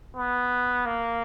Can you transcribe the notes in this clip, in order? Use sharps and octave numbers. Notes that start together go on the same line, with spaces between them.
B3
A#3